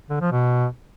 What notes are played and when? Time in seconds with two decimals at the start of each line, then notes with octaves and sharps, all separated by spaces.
0.10 D3
0.21 F3
0.32 B2